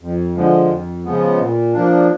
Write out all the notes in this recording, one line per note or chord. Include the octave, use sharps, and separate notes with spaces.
F2
D3 F3 G#3
F2
C#3 F3 G#3 B3
A#2
F3 A#3 D4